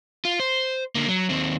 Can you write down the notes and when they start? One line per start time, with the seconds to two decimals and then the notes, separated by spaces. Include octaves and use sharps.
0.25 F4
0.39 C5
0.95 D3 A#3
1.08 F#3
1.29 D#2 C4